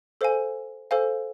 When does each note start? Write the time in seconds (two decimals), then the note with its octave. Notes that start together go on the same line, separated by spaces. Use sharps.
0.21 A4 C5 F5 G#5
0.91 A4 C5 F5 G#5